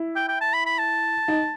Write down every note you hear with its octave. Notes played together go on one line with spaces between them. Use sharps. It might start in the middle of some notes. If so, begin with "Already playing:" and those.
Already playing: E4
G5
G5
A5
B5
B5
A5
D#4